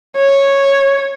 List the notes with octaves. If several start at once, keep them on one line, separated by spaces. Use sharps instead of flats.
C#5